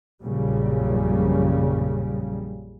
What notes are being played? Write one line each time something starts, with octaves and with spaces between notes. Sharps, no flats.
A#1 F#2 C#3 G3